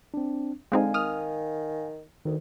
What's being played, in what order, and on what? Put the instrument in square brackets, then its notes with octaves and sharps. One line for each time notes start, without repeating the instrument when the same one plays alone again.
[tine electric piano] C4 D4
[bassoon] D3 [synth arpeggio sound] G#3 C4 D#4 [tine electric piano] F5 G#5
[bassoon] D#3 [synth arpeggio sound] D#6 F6
[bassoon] D2 [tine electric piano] D#3